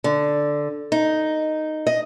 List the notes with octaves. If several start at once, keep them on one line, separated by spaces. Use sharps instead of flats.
D3
D#4
D#5